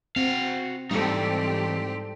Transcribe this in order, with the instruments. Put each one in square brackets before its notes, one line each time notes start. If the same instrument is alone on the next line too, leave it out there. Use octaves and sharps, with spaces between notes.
[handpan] C4 [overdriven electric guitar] F#4 F5
[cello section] G#2 C4 G4 [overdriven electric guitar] E3 D#4 [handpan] G3 A4